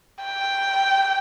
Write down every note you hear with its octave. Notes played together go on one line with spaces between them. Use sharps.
G5